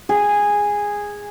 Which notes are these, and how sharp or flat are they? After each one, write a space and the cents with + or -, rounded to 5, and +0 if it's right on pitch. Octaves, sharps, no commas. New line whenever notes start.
G#4 -10